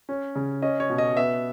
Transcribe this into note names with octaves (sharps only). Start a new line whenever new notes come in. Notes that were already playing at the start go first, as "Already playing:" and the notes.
C#4
C#3
C#4 D#5
C#5
B2
D#5
B3 E5